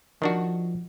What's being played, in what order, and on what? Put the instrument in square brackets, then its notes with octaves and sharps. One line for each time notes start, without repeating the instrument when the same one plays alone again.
[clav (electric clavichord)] D#3 D4 F#4 [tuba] F3